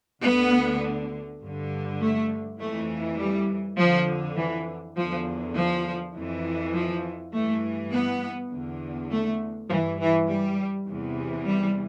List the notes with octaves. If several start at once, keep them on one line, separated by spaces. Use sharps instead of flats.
D2 D3 B3
G2 D3
A3
F2 E3 A3
G3
F2 D3 F3
E3
E2 D3 F3
F3
F2 E3
F3
G2 E3 A3
B3
E2 D3
A3
G2 E3 F3
E3
G3
E2 C3 E3
G3